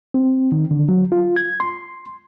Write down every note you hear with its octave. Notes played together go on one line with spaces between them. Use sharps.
C4
D#3
D3
F#3
F4
G#6
C6